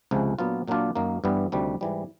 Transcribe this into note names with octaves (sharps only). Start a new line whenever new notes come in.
C#2 C3 F3 G#3
A#2 F#3 B3 D4 F4
A#2 F#3 A#3 D4 F4
F#2 D#3 F#3 A#3 D#4
G2 E3 G3 B3
D2 C3 D#3 G3
G#2 E3 G3